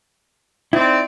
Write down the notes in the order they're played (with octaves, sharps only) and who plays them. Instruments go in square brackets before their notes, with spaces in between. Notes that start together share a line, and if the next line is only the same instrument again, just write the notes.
[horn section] C4 D#4 D5 [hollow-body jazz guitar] E4